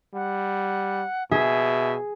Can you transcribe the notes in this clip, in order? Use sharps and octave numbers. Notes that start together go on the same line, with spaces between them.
G3 F#5
B2 G#4 E5 G#5